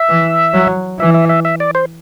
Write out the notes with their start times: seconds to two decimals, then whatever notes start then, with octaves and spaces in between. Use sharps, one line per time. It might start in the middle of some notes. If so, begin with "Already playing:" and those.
Already playing: E5
0.08 E3
0.53 F#3
0.99 E3 E5
1.14 E5
1.29 E5
1.45 E5
1.60 D5
1.75 C5